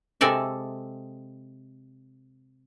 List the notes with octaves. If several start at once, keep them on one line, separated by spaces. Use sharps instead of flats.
C3 G#3 A4 D5 E5